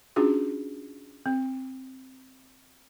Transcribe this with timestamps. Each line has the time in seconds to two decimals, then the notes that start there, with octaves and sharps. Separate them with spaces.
0.16 C#4 D4 F4 F#4 G#4
1.26 C4